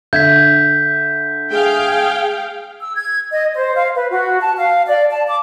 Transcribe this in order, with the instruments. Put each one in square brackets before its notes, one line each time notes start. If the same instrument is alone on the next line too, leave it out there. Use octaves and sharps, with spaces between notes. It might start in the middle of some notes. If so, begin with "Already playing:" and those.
[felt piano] D3 E5 [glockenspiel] G6 G#6 B6
[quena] G#4 [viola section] F5 G5
[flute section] E6
G#6
D#5
C5
F5
B4
F#4
A5
F5
D5
A5
D6